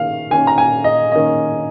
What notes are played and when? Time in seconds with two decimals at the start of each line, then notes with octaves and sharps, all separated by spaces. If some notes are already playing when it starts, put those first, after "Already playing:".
Already playing: D#3 A#3 C#4 F5
0.30 D#3 A#3 C#4 G#5
0.47 A#5
0.58 G#5
0.84 D#5
1.12 D#3 A#3 C#4 D#5